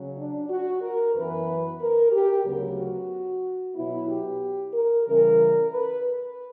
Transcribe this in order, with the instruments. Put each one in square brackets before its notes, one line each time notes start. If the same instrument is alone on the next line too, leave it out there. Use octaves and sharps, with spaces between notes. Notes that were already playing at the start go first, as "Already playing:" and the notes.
Already playing: [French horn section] C#3 F#3 C#4
D4
F#4
A#4
F#2 E3 B3 B4
A#4
G4
D2 C#3 F#3 B3 A#4
F#4
B2 F#3 B3 E4
G4
A#4
C#3 E3 G3 C#4 A#4
B4
B4